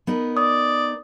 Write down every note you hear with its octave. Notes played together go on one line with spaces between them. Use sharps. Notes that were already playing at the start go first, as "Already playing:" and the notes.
B3 D#4 A#4
D5 D#6